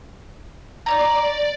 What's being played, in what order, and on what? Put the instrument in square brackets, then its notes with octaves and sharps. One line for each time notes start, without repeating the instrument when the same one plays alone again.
[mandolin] D#4 C#5 A#5 [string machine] D5